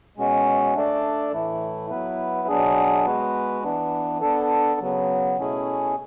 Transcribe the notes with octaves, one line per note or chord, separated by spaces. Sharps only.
B2 G#3 C#4 F#4
A3 D4 A4 D5
A2 E3 A3 E4
F#3 B3 E4 B4
B2 F#3 B3 D4 G#4
G#3 B3 F#4 B4
E3 B3 D4
B3 D4 A4
C#3 F#3 B3
B2 A3 C#4 E4 G#4